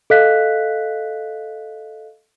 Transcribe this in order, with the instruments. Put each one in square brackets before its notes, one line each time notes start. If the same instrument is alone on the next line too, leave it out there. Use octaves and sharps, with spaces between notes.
[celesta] A4 D#5 F5 F#6 B6